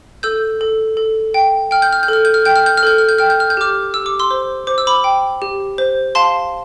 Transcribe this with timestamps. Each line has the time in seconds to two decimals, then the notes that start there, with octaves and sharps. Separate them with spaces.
0.23 A4 E6 G6
0.61 A4
0.97 A4
1.34 G5
1.71 G5 F6
1.82 G6
1.93 F6
2.03 G6
2.08 A4 F6
2.25 G6
2.34 F6
2.45 G5 G6
2.56 F6
2.66 G6
2.77 F6
2.83 A4 G6
2.98 F6
3.09 G6
3.18 G5 F6
3.30 G6
3.40 F6
3.50 G6
3.57 G4 D6 F6
3.94 G4 E6
4.06 D6
4.19 C6 E6
4.31 C5
4.67 C5 D6
4.78 E6
4.87 B5 D6
5.04 G5
5.42 G4
5.78 C5
6.15 F5 A5 C6